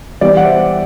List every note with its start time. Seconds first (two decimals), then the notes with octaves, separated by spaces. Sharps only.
0.21 E3 G3 B3 D5
0.37 F#5
0.44 C5 E5